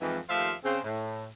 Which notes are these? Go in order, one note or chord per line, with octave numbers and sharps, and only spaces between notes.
F2 G#2 E3
D#2 F3 A3 C5 E5 F5
C#3 C4
A2